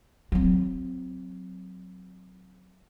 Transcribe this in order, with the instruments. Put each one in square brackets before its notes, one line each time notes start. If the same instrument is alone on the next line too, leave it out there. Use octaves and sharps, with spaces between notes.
[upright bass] F#3 C4